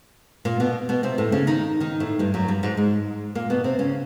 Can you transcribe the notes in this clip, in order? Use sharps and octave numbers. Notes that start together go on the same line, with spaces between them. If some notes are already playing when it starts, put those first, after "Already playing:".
A#2 A#3
B2 B3
B2 B3
C3 C4
A2 A3
C#3 C#4
D#3 D#4
D#3 D#4
A2 A3
G2 G3
F#2 F#3
G2 G3
G#2 G#3
G#2 G#3
A#2 A#3
B2 B3
C3 C4
C#3 C#4